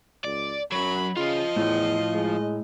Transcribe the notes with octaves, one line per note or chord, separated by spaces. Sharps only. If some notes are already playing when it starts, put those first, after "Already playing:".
C#2 D5
F#2 F#3 B5
C#3 F3 F4 D#5
E2 A2
G#3